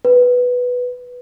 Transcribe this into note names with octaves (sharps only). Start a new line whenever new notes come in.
B4